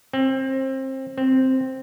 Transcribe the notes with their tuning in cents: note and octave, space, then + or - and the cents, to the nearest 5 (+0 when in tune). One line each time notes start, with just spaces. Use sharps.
C4 +25
C4 +0